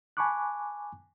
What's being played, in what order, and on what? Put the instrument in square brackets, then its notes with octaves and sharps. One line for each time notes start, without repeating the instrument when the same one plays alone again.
[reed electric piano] G#5 A5 B5 C#6 D6 F#6